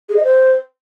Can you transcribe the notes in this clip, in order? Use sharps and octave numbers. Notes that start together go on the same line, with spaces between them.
G#4
D#5
C5